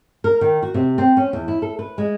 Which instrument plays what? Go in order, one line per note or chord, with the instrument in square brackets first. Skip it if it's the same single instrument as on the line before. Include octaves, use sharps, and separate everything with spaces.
[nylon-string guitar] A#4
D#3
F#4
C3
C4
C#4
E2
E4
A4
B4
G#3